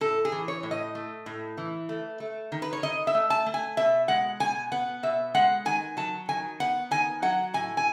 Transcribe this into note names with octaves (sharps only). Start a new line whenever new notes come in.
A2 A4
G#4
E3
C#5
A2
D#5
A3
A2
E3
A3
A3
D#3
B4
C#5
D#3 D#5
E5
A3
A5
A3
G#5
B2 E5
G#3 F#5
B2 G#5
B3 F#5
B2 E5
G#3 F#5
D#3 G#5
F#3 A5
D#3 G#5
B3 F#5
D#3 G#5
F#3 F#5
A2 G#5
G#5